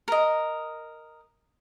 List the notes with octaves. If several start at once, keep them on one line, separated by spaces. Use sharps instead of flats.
A#4 D#5